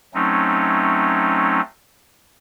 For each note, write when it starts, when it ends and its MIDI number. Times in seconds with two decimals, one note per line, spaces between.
0.14 1.61 54
0.14 1.61 57
0.14 1.61 60
0.14 1.61 61
0.14 1.61 63